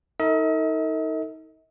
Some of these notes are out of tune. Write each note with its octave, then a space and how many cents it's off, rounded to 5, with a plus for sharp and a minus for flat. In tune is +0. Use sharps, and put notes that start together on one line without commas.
D#4 +30 A4 +45 D#5 +45